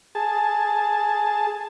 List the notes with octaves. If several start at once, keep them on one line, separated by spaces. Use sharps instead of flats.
G#4 A5